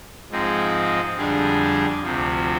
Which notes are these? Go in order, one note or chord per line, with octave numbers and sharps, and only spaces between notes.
G#2 F3 G#3 C4 D#4
F2 D3 G3 D4 G#4
D2 C3 F3